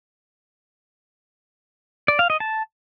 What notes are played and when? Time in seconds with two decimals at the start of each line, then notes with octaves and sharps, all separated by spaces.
2.08 D5
2.19 F5
2.30 D#5
2.40 A5